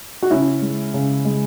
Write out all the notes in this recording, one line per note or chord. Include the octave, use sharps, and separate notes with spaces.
F#4
C#3 C#4 E4
G#3
C#3
G#3